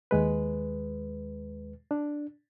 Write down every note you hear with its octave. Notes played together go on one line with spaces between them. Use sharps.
D#2 G#3 B4
D4